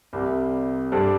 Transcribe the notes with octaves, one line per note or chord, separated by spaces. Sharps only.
C2 C3 G3
G2 G3 C4 A4 D5